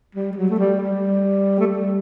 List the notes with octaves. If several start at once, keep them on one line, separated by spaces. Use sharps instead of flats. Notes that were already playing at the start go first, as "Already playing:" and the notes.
G3
G3
F#3
A3
G3
G3
A3
G3